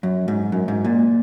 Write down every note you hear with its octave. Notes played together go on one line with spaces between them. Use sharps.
F#2
G#2
F#2
G#2
A#2